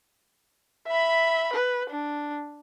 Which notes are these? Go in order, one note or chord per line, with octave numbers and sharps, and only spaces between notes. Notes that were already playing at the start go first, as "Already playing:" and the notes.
E5 B5
B4
D4